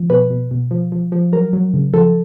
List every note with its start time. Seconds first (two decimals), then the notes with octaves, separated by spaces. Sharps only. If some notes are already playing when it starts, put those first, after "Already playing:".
Already playing: F3
0.10 B2 B4
0.30 B2
0.51 B2
0.71 F3
0.92 F3
1.12 F3
1.33 F#3 A#4
1.53 F#3
1.74 C#3
1.94 F3 A4